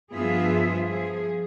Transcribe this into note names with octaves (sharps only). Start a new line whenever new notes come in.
G2 F3 B3 F4 G#4 E5
F3 G#4